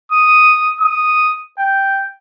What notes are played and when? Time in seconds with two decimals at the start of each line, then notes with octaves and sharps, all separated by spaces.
0.12 D#6
0.81 D#6
1.59 G5